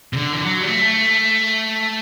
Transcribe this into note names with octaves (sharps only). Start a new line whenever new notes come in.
C3
D3
E3
F#3
G3
A3